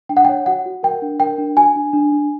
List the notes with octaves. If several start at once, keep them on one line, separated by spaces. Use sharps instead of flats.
D4 G5
F#5
C#5 G5
F#4 F#5
F#4
A#4 G5
D4
A#4 G5
D4
F#4 G#5
D4
D4
D4